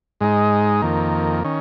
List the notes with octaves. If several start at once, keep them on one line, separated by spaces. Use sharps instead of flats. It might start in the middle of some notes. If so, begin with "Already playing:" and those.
G#2 G#3 D#4
F2 D#3 A#3
D#3 C#4